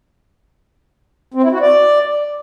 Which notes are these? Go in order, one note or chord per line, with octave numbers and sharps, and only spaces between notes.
C4
E4
F#4
D5